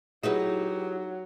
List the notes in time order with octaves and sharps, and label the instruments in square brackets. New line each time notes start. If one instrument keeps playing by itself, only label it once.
[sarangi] F#3 [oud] D#4 E4 B4 [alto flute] G4 [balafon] G#4